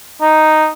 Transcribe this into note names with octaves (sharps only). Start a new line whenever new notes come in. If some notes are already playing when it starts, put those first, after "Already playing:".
D#4